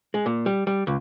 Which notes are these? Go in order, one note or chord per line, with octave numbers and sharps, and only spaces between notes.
G#3
A#2
G3
G3
C#2